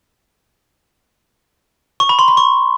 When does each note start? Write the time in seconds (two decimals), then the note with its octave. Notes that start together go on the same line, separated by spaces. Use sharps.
2.00 C#6
2.09 B5
2.19 C6
2.28 B5
2.37 C#6